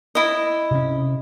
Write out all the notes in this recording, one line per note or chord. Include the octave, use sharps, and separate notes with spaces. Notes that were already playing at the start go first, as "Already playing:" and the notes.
E4 D#5
C3 C#4